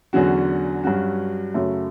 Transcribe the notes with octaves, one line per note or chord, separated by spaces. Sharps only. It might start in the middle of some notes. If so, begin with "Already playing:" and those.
E2 D3 F#3 C#4 F#4
G2 F#3 C#4 F#4
F#2 C#3 F#3 A3